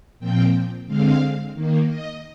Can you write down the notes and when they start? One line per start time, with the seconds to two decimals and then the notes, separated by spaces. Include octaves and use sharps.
0.19 A#2 F3 C4 G5
0.87 D3 G#3 C4 F5
1.54 D#3 A#3
1.87 D#5